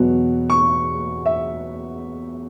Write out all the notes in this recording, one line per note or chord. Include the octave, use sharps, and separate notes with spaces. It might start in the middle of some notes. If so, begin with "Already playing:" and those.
Already playing: E2 B2 F#3
C#6
E5